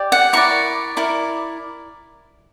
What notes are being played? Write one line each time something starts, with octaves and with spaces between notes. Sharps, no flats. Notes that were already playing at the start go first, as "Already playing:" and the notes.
Already playing: G4 D5
F#5
E4 A#4 D5 C#6
E4 A#4 D5